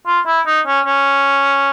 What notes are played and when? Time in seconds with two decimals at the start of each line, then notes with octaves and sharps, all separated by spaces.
0.06 F4
0.27 E4
0.47 D#4
0.66 C#4
0.86 C#4